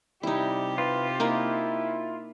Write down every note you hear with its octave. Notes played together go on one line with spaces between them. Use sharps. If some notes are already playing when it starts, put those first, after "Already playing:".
C3 G3 D#4 E4 G4
F4 B4
A#3 D#4 E4 A#4